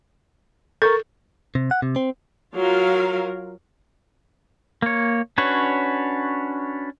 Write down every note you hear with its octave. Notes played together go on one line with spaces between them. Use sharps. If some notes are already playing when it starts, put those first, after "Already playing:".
A4 A#4 C#6 A6
C3
F#5
C3
C4
F#3 F4 A#4 F5
A#3 C#5
C#4 D4 F#4 B4 C#5